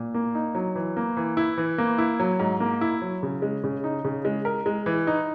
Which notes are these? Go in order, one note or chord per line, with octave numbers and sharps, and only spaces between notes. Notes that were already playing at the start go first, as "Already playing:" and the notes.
Already playing: A#2
A#3
D#4
F#3
E3
A#3
E3
E4
E3
A#3
E4
F#3
G#2
A#3
E4
F#3
C#3
G#3
C#3
D#4
C#3
G#3
A#4
G#3
E3
D#4